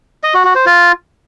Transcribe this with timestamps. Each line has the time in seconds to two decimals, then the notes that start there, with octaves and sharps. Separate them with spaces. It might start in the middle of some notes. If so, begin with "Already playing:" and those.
0.24 D#5
0.34 F#4
0.45 F#4
0.55 C5
0.66 F4